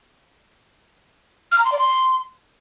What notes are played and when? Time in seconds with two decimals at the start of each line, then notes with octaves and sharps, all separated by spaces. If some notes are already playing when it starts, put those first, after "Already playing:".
1.52 F6
1.58 A#5
1.65 C6
1.72 D5
1.79 C6